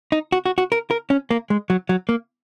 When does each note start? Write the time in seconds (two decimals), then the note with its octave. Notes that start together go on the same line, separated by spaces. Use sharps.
0.12 D#4
0.32 F#4
0.46 F#4
0.58 F#4
0.72 A#4
0.91 A#4
1.10 C#4
1.31 A#3
1.50 G#3
1.70 F#3
1.89 F#3
2.09 A#3